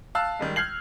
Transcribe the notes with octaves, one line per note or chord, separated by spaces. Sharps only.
F5 A5 E6 F#6
D#3 G3 G#3
F6 G6 G#6 C7 F#7